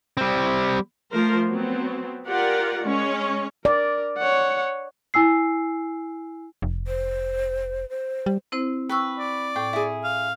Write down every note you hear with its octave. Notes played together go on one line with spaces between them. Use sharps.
G3 C4
F3 A3 A#4 C5
F#3 B3 C4
F4 G4 A#4 D5 F#5
G#3 C#4 C#5
A#4 D5
C#5 F#5
E4 G#5 E6 C7
F1
C5
C5
G3
C4 E4 C5
B4 G5 C#6 E6
D5
A2 G5
E4 G#4
F5